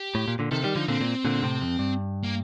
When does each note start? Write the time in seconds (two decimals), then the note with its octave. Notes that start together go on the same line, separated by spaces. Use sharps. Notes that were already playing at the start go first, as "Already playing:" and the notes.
Already playing: G4
0.15 A2
0.28 A#2
0.39 A#2 D3
0.51 C3 D#3 A4
0.64 D#3 G3 G4
0.76 D3 F3 D#4
0.88 A#2 D3 C4
1.01 A#2
1.25 A#2 D3
1.42 A2 C3
1.62 F2
1.79 G2
2.24 A#3